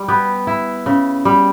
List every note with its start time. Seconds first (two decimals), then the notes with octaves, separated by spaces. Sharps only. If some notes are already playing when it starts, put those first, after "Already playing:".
Already playing: G3
0.08 B3 G4
0.47 E4
0.86 C#3
1.25 G3